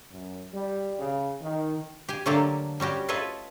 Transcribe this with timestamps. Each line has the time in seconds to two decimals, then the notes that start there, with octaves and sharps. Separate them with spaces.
0.12 F#2
0.53 G3
0.99 C#3
1.42 D#3
2.09 G4 G#5
2.26 D3 F#3 A3 A#3 G4 A4
2.80 G3 C#4 F#4 G4
3.08 F4 A4 B4 C#5 D#5 E5